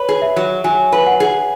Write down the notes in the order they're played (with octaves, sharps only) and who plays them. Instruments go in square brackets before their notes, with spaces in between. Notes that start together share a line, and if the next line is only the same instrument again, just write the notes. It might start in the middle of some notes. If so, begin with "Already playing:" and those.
Already playing: [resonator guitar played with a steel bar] B4 [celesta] C#5
[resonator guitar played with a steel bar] G#4
[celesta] E5
[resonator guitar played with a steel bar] F#3
[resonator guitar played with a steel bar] F#3 [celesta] G#5
[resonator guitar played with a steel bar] B4
[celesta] F#5
[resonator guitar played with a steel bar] G#4